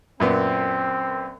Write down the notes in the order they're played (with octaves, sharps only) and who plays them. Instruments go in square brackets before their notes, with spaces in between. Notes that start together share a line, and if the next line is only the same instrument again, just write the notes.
[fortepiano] F#2 A#2 B3 [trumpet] C4